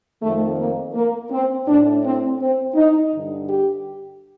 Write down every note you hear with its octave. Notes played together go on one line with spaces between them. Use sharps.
F2 D#3 A3
A#3
A#3
C4
A2 D4
C4
C4
D#4
G2 D3
G4